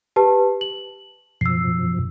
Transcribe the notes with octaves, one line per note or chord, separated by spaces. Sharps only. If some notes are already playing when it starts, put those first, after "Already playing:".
G4 B4 A5
F#7
F#2 B2 F3 E6 C7